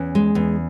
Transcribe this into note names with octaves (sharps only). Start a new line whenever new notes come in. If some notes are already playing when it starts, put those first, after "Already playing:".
Already playing: E2 C#4
G#3
E2